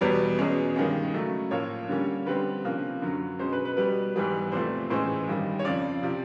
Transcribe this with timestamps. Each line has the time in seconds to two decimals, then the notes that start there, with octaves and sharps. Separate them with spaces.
0.01 E2 B2 G3 B3 C#5
0.39 E2 B2 G#3 C#4
0.76 G2 D#3 G#3 C#4
1.13 C#3 F#3 A3
1.51 A2 F3 A#3 C#5
1.89 D3 G3 A#3 C#4
2.26 D3 G3 C4 B4
2.64 C3 F3 A#3 C#4
3.02 F#2 D3 F#3
3.39 B2 G#3 C#4 C5
3.53 B4
3.65 B4
3.77 B2 G3 B3 B4
4.15 G#2 E3 G3 B3
4.52 E2 C3 F3 A3 C5
4.90 A2 E3 G#3 C#4 C5
5.28 G2 D#3 G3
5.59 C#5
5.65 F2 C#3 F3 D5
6.03 C3 F3